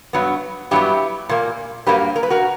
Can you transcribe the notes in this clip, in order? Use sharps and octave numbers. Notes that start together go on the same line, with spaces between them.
G2 F#3 B3
G2 F#3 B3 E4 G4
A#2 A#3
G2 F#3 A#3 G4 B4
A#4
B4
F#4 A#4